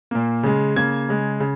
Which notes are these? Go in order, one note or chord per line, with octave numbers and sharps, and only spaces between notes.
A#2 A#3
C#3 G#3
C#3 A#3 G#6
C#3 G#3
C#3